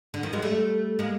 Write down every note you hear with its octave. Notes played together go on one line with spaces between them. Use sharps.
D3
D#3 F3
F#3 G#3
G3 A3
G#3 A#3